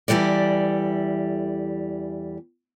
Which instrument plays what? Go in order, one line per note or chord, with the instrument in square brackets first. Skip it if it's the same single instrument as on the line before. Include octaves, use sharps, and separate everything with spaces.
[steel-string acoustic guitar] E2 E3 G3 A4 D5